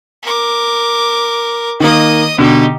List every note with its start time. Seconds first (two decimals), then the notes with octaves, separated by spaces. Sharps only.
0.22 A#4 D6
1.80 D#3 A#3 D#5 D#6
2.38 B2 D3 D#4 G4